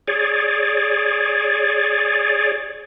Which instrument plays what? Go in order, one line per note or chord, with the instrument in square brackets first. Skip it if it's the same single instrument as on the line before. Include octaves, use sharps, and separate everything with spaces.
[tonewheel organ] G#4 C#5 D5